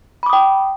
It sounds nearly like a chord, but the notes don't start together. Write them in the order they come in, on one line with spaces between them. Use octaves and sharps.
B5 D6 D#6 G5